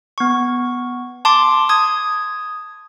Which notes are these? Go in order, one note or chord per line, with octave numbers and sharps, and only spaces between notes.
B3 C#6
A5 C6 D6
D#6 G#6